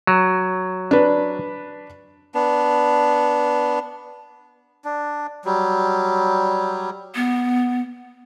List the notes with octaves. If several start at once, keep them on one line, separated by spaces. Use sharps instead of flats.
F#3
D4 B4
B3 D4
D4
F#3 G3
B3